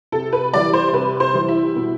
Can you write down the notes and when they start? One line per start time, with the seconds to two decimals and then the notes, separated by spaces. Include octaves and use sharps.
0.12 C3 A4
0.33 B4
0.53 E3 G3 D5
0.73 C5
0.93 C3 B4
1.20 C5
1.34 E3 G3
1.48 E4
1.75 B2